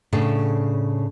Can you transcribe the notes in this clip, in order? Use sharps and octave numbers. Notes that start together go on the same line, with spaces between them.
A2 C#3 D4 A4